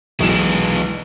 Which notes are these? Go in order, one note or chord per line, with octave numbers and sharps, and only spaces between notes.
B1 E3 G#3 E7